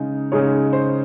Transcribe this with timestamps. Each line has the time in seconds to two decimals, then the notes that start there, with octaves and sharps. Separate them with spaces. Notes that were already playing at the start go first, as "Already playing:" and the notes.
Already playing: C#3 G#3 D#4
0.32 C#3 G#3 D#4 C#5
0.73 C5